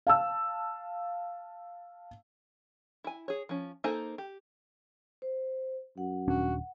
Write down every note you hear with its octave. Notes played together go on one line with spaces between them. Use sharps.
F5 A5 E6
E4 G#5
G#4 C#5
F3 C#4
A#3 D#4 A4 C5 G#5
G4
C5
F#2 F#5
D#1 C#4 D4 F#4